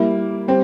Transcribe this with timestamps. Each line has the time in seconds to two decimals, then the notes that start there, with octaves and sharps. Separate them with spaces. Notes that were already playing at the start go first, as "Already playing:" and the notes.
Already playing: G3 A#3 E4
0.48 G3 C4